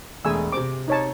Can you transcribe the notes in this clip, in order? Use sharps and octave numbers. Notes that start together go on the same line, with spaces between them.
E1 A3 G#4 G#5 E6
C3 C4 D6
D#4 C#5 A5